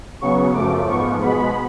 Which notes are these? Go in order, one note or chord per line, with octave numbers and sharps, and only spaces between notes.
C#3 F#3 B3 C#6
F#2 F3 A3 D6
G#2 F3 B3 C#6
B2 G#3 B3 B5